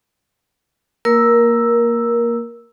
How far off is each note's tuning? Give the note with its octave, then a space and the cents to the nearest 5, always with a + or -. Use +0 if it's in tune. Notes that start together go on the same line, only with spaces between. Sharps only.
A#3 +0 A#4 +15 E6 +0